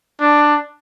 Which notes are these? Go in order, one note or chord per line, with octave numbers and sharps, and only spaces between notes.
D4